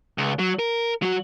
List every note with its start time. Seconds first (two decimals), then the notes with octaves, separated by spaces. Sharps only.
0.18 C#2
0.39 F#3
0.59 A#4
1.02 F#3 F#4